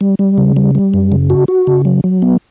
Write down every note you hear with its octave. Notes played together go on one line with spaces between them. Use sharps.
G3
G3
C#3
G3
G3
F#2
C#3
F#4
F#4
C#3
F#3
F#3
B3